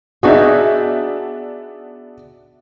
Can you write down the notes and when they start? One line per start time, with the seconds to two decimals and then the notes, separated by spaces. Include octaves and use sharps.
0.23 B3 D4 D#4 F#4 G#4 E5